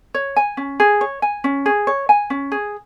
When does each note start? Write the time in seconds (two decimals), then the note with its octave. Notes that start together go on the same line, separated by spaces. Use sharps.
0.14 C#5
0.36 G#5
0.57 C#4
0.80 G#4
1.01 C#5
1.22 G#5
1.44 C#4
1.66 G#4
1.87 C#5
2.09 G#5
2.30 C#4
2.52 G#4